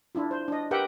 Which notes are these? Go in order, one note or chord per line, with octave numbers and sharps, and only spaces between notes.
D4 E4 F4
C5
D4 D#5
G4 A#4 B4 E5 F#5 G5